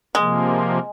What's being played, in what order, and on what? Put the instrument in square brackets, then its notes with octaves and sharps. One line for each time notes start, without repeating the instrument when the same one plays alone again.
[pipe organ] C3 F3 A#3 [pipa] G#3